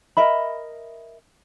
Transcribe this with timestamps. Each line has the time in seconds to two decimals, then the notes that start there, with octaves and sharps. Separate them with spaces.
0.17 A#4 D#5 E5 B5